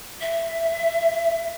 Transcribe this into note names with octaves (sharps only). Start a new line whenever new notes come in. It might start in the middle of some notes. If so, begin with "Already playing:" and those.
E5